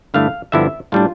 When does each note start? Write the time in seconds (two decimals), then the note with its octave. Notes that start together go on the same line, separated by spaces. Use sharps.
0.14 G2 D3 A3 E4 F5
0.52 G2 D3 F3 B3 E4 E5
0.92 A2 G3 D4 F4